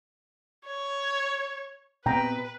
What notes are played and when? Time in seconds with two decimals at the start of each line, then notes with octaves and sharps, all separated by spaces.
0.67 C#5
2.06 A#2 B3 C4 B4 G5 A#5